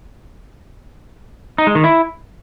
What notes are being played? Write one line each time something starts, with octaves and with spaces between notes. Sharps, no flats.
D#4
G#3
D#3
E4